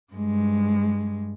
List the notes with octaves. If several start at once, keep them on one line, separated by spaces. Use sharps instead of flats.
G2 G#3